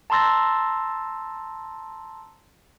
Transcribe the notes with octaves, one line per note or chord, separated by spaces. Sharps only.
A5 A#5 C6 E6 A6 A#6